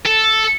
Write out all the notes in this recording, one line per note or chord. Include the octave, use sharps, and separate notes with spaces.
A4